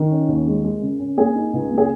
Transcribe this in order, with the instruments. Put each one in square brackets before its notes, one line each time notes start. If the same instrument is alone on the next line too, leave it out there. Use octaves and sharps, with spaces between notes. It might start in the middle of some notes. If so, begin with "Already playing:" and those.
Already playing: [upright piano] D#3 A#4
C#4
D#2
G#3
G#3
C#3
C#4
A#3 G#4
D#4
C#2
A#3
G#4